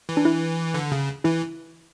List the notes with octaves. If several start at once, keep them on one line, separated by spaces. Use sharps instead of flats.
E3
D4
E4
D3
C#3
E3 E4